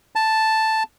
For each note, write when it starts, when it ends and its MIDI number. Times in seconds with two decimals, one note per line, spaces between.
0.15 0.83 81